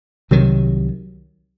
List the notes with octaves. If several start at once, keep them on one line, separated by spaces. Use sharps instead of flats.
C2 C3 D#3 F#3